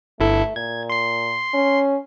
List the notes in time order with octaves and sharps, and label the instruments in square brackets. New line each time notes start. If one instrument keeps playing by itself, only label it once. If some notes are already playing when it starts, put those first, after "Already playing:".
[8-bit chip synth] G1 E4 A4 [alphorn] A3
[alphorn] A#2 [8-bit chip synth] G#6
[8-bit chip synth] C6 C7
[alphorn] C#4